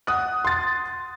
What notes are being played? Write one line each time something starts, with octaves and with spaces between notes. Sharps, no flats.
F#5 D#6 F#6
C6 A6